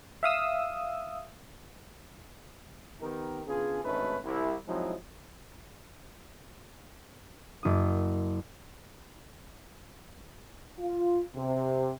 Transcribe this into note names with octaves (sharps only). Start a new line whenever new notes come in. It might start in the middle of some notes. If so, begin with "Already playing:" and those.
E5 F5 D#6 E6
D#3 B3 D#4 G4 A#4
C#3 B3 D4 F4 G#4
G#1 D2 A3 C#4 D#4 B4
C2 E4
F3 F#3 G#3 C4 D#4 E4
F#1 D#6
F4
C3